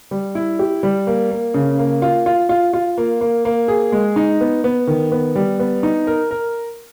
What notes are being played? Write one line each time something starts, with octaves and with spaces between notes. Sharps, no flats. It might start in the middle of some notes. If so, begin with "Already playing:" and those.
G3
E4
G4
G3
A#3
A#3
C#3
A#3
F4
F4
F4
F4
A#3
A#3
A#3
G#4
G#3
D#4
B3
B3
D#3
B3
G3
B3
D#4
A#4
A#4